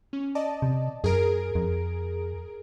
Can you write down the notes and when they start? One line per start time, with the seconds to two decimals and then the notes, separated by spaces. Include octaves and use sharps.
0.13 C#4
0.35 D5 D#5 A5
0.62 C3
1.04 F#2 G#4 A#4 D7
1.55 F2